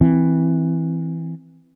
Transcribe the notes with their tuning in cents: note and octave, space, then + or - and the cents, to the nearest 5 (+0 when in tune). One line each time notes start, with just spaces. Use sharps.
E3 -5 C4 -10